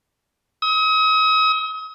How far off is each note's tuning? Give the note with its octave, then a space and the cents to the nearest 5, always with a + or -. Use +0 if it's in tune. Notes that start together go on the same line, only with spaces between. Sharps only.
D#6 +40